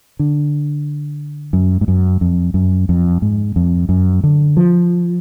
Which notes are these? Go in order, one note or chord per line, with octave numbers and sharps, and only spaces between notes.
D3
F#2
G#2
F#2
F2
F#2
F2
G#2
F2
F#2
D3
F3